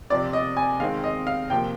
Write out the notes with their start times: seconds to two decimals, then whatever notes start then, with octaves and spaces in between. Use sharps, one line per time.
0.10 C3 F3 C4 D5
0.33 D#5
0.57 G#5
0.80 D#3 G#3 C4 D#4 F5
1.04 D#5
1.27 F5
1.50 C3 F3 A#3 G5